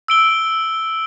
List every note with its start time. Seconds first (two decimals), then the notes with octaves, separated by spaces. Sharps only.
0.08 E6 D7 G7